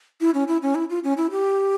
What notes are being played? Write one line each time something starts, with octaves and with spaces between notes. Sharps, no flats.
E4
C#4
E4
C#4
E4
F4
C#4
E4
G4